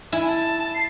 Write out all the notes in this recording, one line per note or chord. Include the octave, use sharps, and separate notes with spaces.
E4 G#5
A5
C7